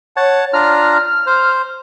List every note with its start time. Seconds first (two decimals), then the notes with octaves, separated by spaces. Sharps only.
0.16 C#5 F#5 A5
0.53 D4 F4 A#5 F6
1.27 C5